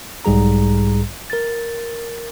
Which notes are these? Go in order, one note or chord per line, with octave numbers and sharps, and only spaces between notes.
B1 G#2 G3 G#4 A#5
A#4 A6